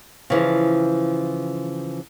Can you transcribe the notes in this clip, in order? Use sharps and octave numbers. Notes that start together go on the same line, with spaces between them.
C#3 E3 F3